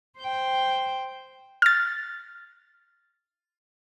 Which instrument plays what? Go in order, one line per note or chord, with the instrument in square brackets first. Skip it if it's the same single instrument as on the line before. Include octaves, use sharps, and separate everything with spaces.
[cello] C5 G5
[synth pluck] F6 A6